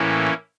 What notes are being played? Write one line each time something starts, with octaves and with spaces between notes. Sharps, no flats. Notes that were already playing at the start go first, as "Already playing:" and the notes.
Already playing: A2 E3 A#3 C#4 E4